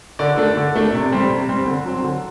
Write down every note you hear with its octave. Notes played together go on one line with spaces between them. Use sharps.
D3 D5
A3 D4
D3
A3 D4
C3
G3 C4
C3
G3 C4
D3
F#3 C4
D3